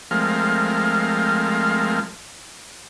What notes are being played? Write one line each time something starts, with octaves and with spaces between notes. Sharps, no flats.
F3 G#3 A3 C4 A#4 F5